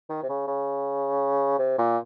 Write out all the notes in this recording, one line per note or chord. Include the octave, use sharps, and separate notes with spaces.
D#3
C3
C#3
C#3
C3
A#2